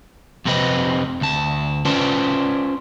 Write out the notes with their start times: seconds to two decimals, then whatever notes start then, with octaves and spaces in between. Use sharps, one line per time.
0.45 F2 C3 C4 B4 D#5
1.21 D2 A5
1.85 C#4 F4 B4 C5 D5 A5